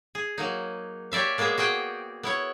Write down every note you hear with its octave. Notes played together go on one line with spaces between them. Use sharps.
G#4
F#3 A#3 D#4
G4 C#5 D5 E5 F5
G#3 A#3 B3 G#4 E5
F#4 G#4 F#5 G5
B3 E4 C#5